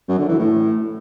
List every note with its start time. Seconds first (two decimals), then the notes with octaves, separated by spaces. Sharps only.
0.09 F#2
0.19 D3
0.29 E3
0.39 A2